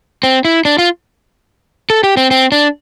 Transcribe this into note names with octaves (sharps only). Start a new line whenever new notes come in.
C4
E4
D4
F4
A4
G4
C4
C4
D4